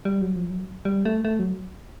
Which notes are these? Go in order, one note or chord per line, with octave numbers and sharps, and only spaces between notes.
G3
F#3
F3
F#3
G3
A3
A3
F#3